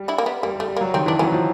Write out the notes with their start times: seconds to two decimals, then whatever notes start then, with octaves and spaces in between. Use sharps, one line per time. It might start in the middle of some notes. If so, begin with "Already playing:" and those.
Already playing: G3
0.08 D4 E4
0.18 A#3
0.26 B3
0.43 G3 A#3
0.56 G3
0.60 A3
0.69 G3
0.76 A#3
0.81 F#3
0.94 D#3 C4
1.06 E3 D4
1.19 F#3 B3 C#4
1.32 F3